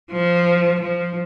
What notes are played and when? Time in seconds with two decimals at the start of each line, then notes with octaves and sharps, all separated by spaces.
0.12 F3
0.81 F3